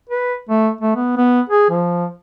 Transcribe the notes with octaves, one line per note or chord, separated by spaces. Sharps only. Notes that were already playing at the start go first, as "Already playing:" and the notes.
B4
A3
A3
B3
B3
G#4
F3